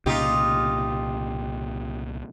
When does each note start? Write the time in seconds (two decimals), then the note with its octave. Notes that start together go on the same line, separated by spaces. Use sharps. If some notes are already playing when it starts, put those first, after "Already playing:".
0.06 C2 A#2 C#3 D#4 F4 G4